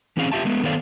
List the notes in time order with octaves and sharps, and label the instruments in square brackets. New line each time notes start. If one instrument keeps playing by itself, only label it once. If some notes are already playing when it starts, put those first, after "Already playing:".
[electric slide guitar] E3 C4 C#4 G#4 F5
F4 G4 E5 A5
G#3 A3 B3
D#3 B3 A4 C5 D5 F5